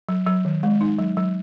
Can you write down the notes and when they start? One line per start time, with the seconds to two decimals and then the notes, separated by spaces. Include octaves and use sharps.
0.09 F#3
0.27 F#3
0.45 D#3
0.63 G#3
0.81 D#4
0.99 F#3
1.17 F#3